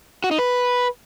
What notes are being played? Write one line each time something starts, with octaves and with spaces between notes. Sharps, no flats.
F#4
D#4
B4